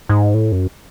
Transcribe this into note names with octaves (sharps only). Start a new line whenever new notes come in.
G#2
A2
F#2